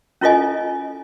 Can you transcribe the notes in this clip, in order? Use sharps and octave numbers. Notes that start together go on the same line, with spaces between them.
C#4 E4 F4 A4 D#5 G#5